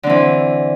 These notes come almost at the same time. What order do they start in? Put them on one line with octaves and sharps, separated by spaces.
D3 C4 E3